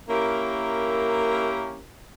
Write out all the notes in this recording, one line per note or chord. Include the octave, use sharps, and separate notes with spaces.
A#3 C#4 E4 G4 A#4